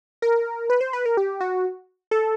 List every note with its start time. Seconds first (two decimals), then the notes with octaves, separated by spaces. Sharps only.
0.22 A#4
0.70 B4
0.81 C5
0.93 B4
1.06 A#4
1.17 G4
1.41 F#4
2.11 A4